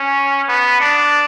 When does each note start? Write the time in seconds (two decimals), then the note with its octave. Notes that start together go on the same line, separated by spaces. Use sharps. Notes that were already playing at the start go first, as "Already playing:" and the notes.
Already playing: C#4
0.49 B3
0.81 D4